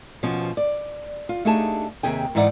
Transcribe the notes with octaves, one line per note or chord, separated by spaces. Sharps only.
B2 F3 B3 C#4
D5
F4
A3 D4 D#4 G4 G#4 A5
D#2 C3 G#4 G5
G#2 E3 D#4 E4 D5 F#5